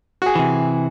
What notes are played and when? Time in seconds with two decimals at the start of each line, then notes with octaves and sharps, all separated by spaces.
0.22 F#4 G#4
0.35 C3 E3